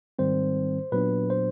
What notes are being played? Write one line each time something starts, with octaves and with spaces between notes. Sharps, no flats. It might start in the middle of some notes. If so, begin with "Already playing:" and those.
G#2 D#3 G3 C4 C5
A#2 F#3 B3 D4 B4
C5